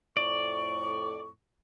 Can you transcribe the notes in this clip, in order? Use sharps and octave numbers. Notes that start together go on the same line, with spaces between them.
F2 A2 D5 C#6